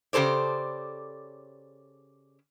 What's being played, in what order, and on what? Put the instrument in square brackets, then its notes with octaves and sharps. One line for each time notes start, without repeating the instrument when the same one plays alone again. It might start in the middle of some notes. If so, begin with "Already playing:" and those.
[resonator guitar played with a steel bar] C#3 G4 A4 C5 D5